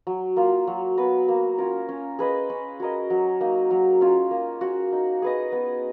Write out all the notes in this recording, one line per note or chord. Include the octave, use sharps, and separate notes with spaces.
F#3
A#3 F4
F#3
B3 F#4 B4
A#3
C#4 F4 A#4
C#4
G#4 B4 D#5
C#4
F#4 A#4 D#5
F#3
A#3 D#4
F#3
C#4 F4
A#3
C#4 F#4
D#4
G#4 B4 D#5
B3